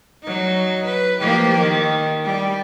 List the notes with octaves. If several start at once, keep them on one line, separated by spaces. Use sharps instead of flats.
F#3 D#4
B4
F3 A#3 G4
D#3
G3